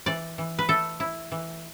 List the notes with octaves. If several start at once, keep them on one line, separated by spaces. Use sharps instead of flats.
E3 D5
E3
B4
A3 A4
E4
E3